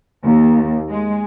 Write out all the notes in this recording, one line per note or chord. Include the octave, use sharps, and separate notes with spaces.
D#2
G#3